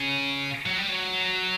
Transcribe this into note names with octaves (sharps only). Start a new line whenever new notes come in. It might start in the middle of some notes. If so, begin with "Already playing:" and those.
Already playing: C#3
F#3
G3
F#3